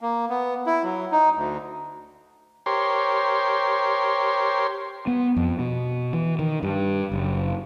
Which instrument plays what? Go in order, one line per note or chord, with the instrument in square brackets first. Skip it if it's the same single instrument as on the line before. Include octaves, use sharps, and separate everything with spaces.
[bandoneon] A#3
B3
E4
F#3
D#4
D2
[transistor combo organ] G4 A#4 C5 C#5 C6
[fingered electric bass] B3
F2
B2
E3
D#3
G2
F#1